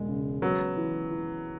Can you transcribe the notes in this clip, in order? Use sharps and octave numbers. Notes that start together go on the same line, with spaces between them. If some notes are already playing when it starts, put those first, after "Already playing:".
Already playing: E1 G#3
C#3
F#3 B3
E3
E3